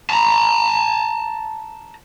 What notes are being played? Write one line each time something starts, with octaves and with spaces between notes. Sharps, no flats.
A5 A#5